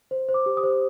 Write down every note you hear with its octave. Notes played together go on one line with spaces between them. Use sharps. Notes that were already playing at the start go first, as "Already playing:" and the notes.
C5
C5
D6
G4
D#6
C5